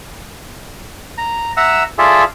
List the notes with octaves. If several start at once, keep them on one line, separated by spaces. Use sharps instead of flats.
A#5
E5 F#5 A#5 E6
F4 G#4 A4 D5 E5